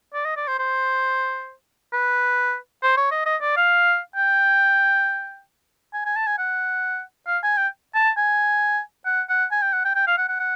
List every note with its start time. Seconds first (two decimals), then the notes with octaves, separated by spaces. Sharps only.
0.14 D5
0.25 D#5
0.37 D5
0.47 C5
0.59 C5
1.93 B4
2.83 C5
2.97 C#5
3.11 D#5
3.26 D#5
3.42 D5
3.57 F5
4.16 G5
5.94 G#5
6.06 G#5
6.17 A5
6.27 G#5
6.39 F#5
7.27 F5
7.43 G#5
7.57 G5
7.95 A5
8.17 G#5
9.06 F#5
9.29 F#5
9.51 G#5
9.62 G5
9.73 F#5
9.85 G5
9.95 G5
10.07 F5
10.18 F#5
10.29 F#5
10.40 F#5